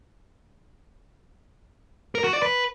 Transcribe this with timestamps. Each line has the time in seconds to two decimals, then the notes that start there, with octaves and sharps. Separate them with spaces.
2.15 A#4
2.24 F#4
2.33 D5
2.42 B4